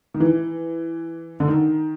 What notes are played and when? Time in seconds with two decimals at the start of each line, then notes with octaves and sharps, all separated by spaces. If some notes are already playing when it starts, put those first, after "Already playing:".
0.14 D#3
0.20 E3
1.40 D3
1.48 D#3